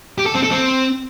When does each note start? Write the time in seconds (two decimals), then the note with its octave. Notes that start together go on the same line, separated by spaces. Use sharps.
0.18 G4
0.26 A4
0.35 C4
0.43 A4
0.51 C4